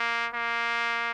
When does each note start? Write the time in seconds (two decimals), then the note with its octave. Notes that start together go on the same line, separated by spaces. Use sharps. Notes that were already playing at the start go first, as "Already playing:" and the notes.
Already playing: A#3
0.34 A#3